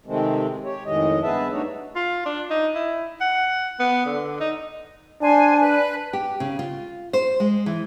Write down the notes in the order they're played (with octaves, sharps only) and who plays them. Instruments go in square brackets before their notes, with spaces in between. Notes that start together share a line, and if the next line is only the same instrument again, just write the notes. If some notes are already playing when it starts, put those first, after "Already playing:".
[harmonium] C3 D#3 G#3 A3 C4
G4 C#5
F2 A2 D#3 G#3 D#5
G2 B3 G#4 B4 E5 A5
A3 D4 D#4 F#4 A#4 C#5
[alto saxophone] F4
D4
D#4
E4
F#5
B3
D3
D#4
[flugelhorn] D4 [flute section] C5 G#5
[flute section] B4
[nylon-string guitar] G4
C#3
F4
C5
G#3
E3